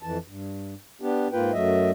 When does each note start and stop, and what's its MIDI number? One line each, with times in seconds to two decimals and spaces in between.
0.03 0.18 41
0.03 0.18 52
0.03 0.18 81
0.27 0.74 43
1.01 1.28 59
1.01 1.28 62
1.01 1.28 67
1.33 1.52 44
1.33 1.52 58
1.33 1.52 65
1.33 1.52 71
1.33 1.52 79
1.53 1.91 42
1.53 1.91 54
1.53 1.91 57
1.53 1.91 75
1.53 1.91 76